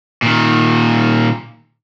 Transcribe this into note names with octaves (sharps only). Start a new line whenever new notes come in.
A#2 D#3